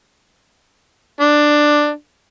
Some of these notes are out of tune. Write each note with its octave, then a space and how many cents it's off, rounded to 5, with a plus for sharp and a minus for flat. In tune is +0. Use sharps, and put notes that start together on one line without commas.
D4 +10